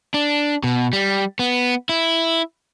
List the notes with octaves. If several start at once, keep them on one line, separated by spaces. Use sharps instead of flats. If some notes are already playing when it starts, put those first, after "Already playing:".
D4
B2
G3
B3
E4